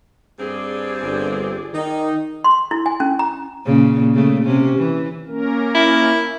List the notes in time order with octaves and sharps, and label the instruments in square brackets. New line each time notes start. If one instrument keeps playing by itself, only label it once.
[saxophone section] G2 C4 [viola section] G#4 D5
[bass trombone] G1
[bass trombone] D#3 [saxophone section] D#4
[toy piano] C6
E4
G#5
C#4
A#5
[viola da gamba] A#2 C#3
C#3 A3
C3 C#4
E3
[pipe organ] A#3 C#4 A#4
[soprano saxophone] E4